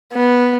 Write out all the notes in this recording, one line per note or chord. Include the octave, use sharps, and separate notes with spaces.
B3